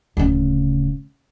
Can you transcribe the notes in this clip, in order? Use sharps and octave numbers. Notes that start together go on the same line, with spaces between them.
D1 C#3